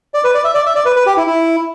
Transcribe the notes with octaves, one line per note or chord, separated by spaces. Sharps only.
D5
B4
D5
E5
D5
E5
D5
B4
B4
G4
E4
E4